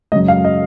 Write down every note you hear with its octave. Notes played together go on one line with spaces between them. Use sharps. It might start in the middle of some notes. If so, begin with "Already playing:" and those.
F#2 C#3 G#3 D#5
F5
D#5